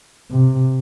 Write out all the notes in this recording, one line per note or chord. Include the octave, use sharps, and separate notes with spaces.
C3